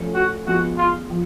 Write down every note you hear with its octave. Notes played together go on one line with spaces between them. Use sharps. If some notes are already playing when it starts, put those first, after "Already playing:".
Already playing: F3 A3 C#4
F#4
F3 G#3 B3 F#4
F4
F3